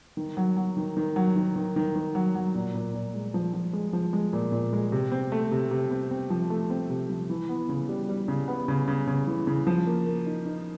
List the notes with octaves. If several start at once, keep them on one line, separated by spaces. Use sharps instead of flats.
D#3
F#3
F#3
D#3
D#3
F#3
D#3
D#3
D#3
D#3
F#3
F#3
A#2
A#2
A#2
G#3
F3
F3
G#3
F3
G#3
A#2
A#2
G#3
C3
C4
A3
C3
C3
C4
C4
F3
A3
C4
C3
F3
E3
B3
C#3
G3
G3
C#3
B3
C#3
C#3
C#3
E3
C#3
F3
A#3
A#3
D#4
D#4